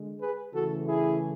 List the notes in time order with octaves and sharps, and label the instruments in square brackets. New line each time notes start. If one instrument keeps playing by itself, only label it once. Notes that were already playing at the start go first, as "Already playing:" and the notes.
Already playing: [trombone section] D3 G#3
G#4 B4
C#3 E3 A3 F#4 A4
E4 G#4